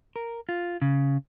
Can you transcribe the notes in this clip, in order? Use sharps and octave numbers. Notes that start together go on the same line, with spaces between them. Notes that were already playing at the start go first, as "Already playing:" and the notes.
A#4
F4
C#3